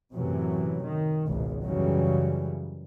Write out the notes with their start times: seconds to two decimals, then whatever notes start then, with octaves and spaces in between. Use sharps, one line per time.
0.14 F#2 A2 C3 E3 F#3
0.83 D#3
1.27 G#1 C#2 B2
1.63 F#2 C#3 E3 F#3 G3